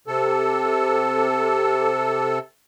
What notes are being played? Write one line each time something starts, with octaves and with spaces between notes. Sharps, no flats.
C3 A4